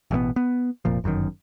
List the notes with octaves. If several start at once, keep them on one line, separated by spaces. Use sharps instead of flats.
A1 G2 B2 B3
B3
F1 A#2 F3
G1 F#2 B2 D#3